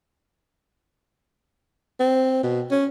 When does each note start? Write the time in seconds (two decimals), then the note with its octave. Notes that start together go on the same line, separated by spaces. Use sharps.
2.00 C4
2.43 B2
2.71 C#4